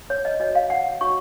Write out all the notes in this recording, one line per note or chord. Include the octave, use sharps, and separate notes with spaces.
C#5
D#5
F#4 C#5 D#5
F5
F#5
F#4 C#5 C#6